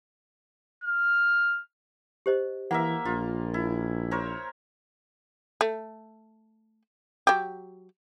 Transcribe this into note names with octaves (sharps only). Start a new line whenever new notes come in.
F6
G4 C5 D#5
E3 A#3 A#4 E5 F#5
A#1 F4
E4
A#4 C5 C#5
A3
F#3 G4